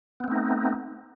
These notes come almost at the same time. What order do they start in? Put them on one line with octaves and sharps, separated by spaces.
B3 C4 A3 D#4